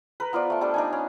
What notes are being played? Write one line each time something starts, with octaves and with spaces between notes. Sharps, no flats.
A#4 B4
B3 F4 C5 D5
A3 A5
G3 A3 D4
D4 D#4 G#5
C#4